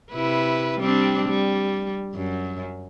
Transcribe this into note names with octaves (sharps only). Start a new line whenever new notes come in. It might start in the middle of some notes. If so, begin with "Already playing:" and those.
C3 E4 B4
G3 C4 D4
G3
F#2